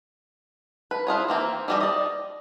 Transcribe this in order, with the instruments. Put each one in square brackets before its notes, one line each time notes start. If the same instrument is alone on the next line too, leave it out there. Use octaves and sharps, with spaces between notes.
[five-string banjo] B4
E4 F4 G#4 C#5
E3 A#3 C4
E3 G3 D#5
D5 D#5